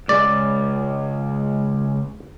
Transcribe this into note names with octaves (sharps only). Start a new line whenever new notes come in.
C#2 G#3 D5